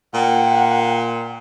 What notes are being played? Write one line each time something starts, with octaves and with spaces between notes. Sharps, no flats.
A#2 F#5 G5